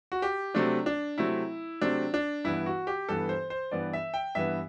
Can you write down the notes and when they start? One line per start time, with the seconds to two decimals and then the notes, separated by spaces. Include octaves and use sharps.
0.12 F#4
0.22 G4
0.54 C3 F#3 A3 C4 D4
0.86 D4
1.18 C3 F#3 A3 C4 E4
1.81 C3 F#3 A3 C4 D4
2.14 D4
2.44 G2 E3 B3 E4
2.66 F#4
2.87 G4
3.09 G2 E3 B3 A4
3.29 C5
3.50 C5
3.71 G2 E3 B3 D5
3.93 E5
4.14 G5
4.35 G2 E3 B3 E5